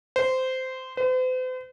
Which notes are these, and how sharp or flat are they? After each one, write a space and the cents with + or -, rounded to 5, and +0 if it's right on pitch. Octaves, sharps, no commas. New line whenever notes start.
C5 -15
C5 -45